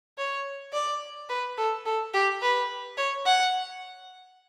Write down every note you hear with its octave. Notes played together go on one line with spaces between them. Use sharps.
C#5
D5
B4
A4
A4
G4
B4
C#5
F#5